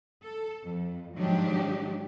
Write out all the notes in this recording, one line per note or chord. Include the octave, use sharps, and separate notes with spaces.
A4
F2
G#2 D#3 F3 F#3 D4 G4